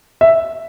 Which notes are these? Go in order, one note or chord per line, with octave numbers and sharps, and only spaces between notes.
E5